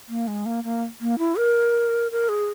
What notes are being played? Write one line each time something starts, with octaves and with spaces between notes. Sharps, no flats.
A#3
G#3
A#3
A#3
A#3
E4
A#4
A#4
G#4